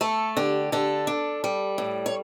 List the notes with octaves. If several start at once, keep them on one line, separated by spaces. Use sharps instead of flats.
A3 A4
D3 G4
D3 A4
D4
G3
A2
C#5